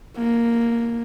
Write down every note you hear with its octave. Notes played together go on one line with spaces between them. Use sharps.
A#3